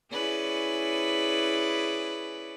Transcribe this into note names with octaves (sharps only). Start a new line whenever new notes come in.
C#4 E4 G#4 B4 D5